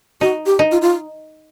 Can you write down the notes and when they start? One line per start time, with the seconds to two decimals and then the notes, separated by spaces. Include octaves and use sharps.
0.21 D#4 F#4
0.46 G4
0.59 D#4
0.71 F4
0.81 F4